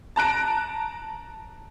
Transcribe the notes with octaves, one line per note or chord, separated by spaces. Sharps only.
A5 A#5 F#6 D7